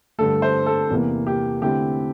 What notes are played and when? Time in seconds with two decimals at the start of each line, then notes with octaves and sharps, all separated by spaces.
0.18 G2 D3 A3 A4
0.42 C5
0.66 A4
0.90 E2 C3 E3 A#3
1.27 G4
1.62 D3 A3 C4 E4 G4